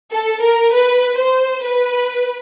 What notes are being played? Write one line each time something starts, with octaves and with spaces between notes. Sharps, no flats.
A4
A#4
B4
C5
B4